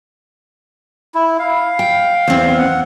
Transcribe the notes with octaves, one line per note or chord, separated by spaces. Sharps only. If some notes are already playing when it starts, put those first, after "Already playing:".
E4
F5
G5
E2 C4
F#5